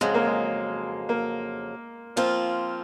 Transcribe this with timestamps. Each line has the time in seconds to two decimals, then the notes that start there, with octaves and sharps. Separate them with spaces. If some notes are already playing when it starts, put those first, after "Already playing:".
0.01 F2 C#3 F#3 G#3
0.14 A#3
0.27 G#3
1.09 A#3
2.16 F3 A#3 C4 F4